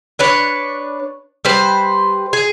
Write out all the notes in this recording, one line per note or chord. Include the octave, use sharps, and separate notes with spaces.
D4 B4 C#5
G3 B4 C5
G#4